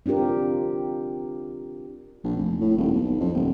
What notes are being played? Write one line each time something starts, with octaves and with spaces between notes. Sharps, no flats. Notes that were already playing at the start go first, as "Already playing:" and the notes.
C4 D4 F4 G4 A#4
A#1
F1
A2
D#1
B1
F2
D#1